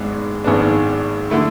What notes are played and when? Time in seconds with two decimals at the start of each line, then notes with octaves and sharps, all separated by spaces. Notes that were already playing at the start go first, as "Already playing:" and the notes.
Already playing: G#1 G#2 G#3 B3 D4
0.44 G#1 G#2 G#3 B3 D4
1.30 D3 A3 E4